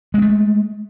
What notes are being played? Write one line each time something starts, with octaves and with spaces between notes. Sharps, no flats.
G#3 A3 C4